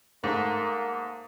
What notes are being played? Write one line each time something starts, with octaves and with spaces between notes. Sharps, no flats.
G#2 A3 A#3